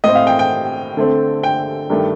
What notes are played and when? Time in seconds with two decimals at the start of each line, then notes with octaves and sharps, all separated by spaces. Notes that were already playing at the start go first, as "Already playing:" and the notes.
0.04 A2 A3 C4 D#5
0.15 F5
0.27 G5
0.39 G5
0.97 D3 A3 C4
1.43 G5
1.90 G2 D#3 A3